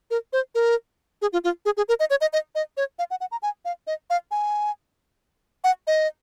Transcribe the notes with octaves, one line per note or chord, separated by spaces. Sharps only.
A#4
C5
A#4
G#4
F4
F4
G#4
G#4
A#4
D#5
C#5
D#5
D#5
D#5
C#5
F5
F#5
F#5
A#5
G#5
F5
D#5
F5
G#5
F#5
D#5